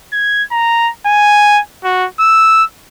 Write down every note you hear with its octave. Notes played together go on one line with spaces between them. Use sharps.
G#6
A#5
G#5
F#4
E6